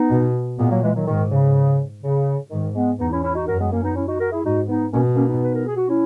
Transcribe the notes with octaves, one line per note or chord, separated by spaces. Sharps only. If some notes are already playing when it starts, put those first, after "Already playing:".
Already playing: B3 D#4
B2
A#2 G#3 B3
F#3 A#3
E3 G#3
D#3 F#3
G#2 D#3
C#3
C#3
G#2 D#3
G#3 B3
E2 B3 D#4
C#4 E4
C#4 E4
D#4 F#4
F#2 F#4 A#4
G#3 B3
A#3 C#4
B3 D#4
C#4 E4
D#4 F#4
F#4 A#4
E4 G#4
G#2 D#4 F#4
B3 D#4
B2 A#3 C#4
A#3 C#4
B3 D#4
B4
A#4
G#4
F#4
C#4 E4